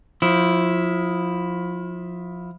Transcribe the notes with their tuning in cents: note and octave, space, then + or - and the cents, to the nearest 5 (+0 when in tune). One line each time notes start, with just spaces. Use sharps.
F3 +25 E4 +0